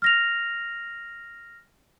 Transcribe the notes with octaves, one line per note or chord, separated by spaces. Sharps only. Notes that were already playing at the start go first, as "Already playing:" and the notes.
F6 A#6 F7